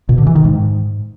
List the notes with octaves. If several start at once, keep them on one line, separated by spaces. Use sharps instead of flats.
B2
D3
E3
D#3
G#2